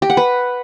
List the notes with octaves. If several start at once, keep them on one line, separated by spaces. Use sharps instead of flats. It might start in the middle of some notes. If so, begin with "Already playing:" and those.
G4
F#5
B4